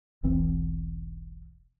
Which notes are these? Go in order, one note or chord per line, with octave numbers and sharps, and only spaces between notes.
E1 B1 E3 C4